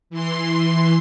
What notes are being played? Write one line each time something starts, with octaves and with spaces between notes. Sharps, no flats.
E3 C6